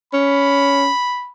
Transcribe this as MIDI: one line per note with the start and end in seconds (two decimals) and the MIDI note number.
0.13 0.89 61
0.13 1.32 83